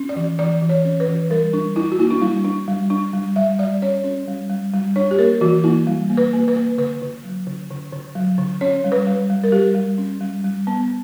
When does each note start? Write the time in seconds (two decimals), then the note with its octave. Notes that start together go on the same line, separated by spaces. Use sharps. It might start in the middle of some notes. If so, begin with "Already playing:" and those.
Already playing: C#4
0.09 D5
0.16 E3
0.39 E3 D5
0.61 E3
0.69 C#5
0.85 C#4
1.00 B4
1.08 E3
1.30 G3 A#4
1.53 G3 D4
1.76 D4 E4
1.92 F#4
1.99 A#3 E4
2.10 D4
2.22 G3 E4
2.45 D4
2.68 G3
2.90 D4
3.13 G3
3.36 G3 E5
3.59 G3 D5
3.82 C#4 C#5
4.04 C#4
4.28 G3
4.50 G3
4.74 G3
4.96 D4 C#5
5.11 G4
5.19 A#3 A#4
5.41 E3 F#4
5.64 A#3 E4
5.87 G3
6.10 A#3
6.17 B4
6.33 A#3
6.48 B4
6.56 A#3
6.78 D3 B4
7.02 D3
7.24 F#3
7.47 D3
7.70 D3
7.93 D3
8.15 F#3
8.38 D3
8.61 C#4 C#5
8.84 G3
8.92 B4
9.07 G3
9.30 G3
9.44 A#4
9.52 G3 G4
9.75 G3
9.98 C#4
10.21 G3
10.44 G3
10.67 B3